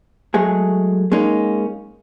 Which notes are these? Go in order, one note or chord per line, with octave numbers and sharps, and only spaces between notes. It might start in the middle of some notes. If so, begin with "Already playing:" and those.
F#3 G#3 A3 G#4
G#3 A#3 C#4 D#4